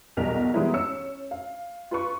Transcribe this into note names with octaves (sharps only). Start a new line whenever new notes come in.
B1 E2 B2 G3 A#4 F7
E3 G3 G#3 B3 D#4 E4
C#4 E6 C#7
F5
F4 B4 C#6